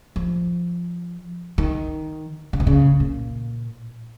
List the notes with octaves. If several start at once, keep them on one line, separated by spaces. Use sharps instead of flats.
F3
D#3
C#3
B2
C#3
A#2